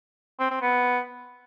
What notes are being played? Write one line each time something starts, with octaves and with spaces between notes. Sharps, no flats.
C4
C4
B3